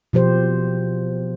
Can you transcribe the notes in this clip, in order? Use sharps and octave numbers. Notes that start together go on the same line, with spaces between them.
B2 F3 G4 C5